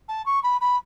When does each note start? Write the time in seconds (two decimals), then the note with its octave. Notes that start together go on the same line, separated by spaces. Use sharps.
0.09 A5
0.26 C#6
0.43 B5
0.61 B5